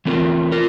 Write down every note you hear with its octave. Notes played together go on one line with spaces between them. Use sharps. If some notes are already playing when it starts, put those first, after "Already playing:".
E3 A3 C4 F4 A#4
F4 A#4